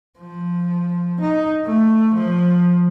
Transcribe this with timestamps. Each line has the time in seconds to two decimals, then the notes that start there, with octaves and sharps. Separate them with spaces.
0.19 F3
1.20 D#4
1.66 A3
2.15 F3